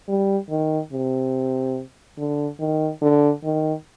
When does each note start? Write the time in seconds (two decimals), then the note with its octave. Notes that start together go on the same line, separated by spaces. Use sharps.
0.08 G3
0.50 D#3
0.93 C3
2.18 D3
2.60 D#3
3.02 D3
3.44 D#3